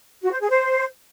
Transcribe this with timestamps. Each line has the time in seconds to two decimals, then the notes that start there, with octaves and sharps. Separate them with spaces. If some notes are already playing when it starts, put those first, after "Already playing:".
0.23 F#4
0.32 C5
0.41 G#4
0.50 C5